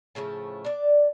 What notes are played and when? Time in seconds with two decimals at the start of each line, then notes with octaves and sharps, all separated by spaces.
0.15 A2 C#3 F3 A3
0.65 D4 D5